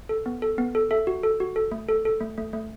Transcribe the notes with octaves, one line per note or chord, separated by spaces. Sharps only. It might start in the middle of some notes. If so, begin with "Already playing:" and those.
A4
B3
A4
B3
A4
A4 E5
F#4
A4
F#4
A4
A3
A4
A4
A3
A3
A3